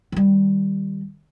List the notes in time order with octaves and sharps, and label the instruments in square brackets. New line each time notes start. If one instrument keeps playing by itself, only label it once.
[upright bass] D#3 G3